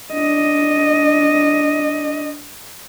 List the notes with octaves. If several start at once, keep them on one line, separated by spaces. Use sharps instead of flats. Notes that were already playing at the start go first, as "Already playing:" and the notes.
D4 D#5